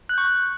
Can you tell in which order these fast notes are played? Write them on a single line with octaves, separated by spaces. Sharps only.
F#6 G6 C#6